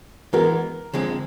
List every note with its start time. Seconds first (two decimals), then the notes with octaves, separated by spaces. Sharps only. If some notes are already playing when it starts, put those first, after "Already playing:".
0.33 E3 G#3 B3 A#4
0.93 D3 F3 G#3 C4